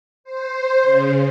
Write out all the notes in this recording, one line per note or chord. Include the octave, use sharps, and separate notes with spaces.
C5
C#3